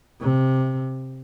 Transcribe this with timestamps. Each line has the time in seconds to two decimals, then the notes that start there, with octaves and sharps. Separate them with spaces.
0.21 C3